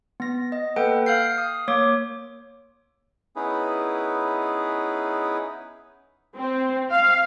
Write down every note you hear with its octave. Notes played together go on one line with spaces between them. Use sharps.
B3 A#6
D#5
A#3 A4 B4 F#5 G5
F5 F6 G6 C7
D#6
A#3 C#5 D6
B3 C#4 D#4 E4 G#4 B4
C4
F5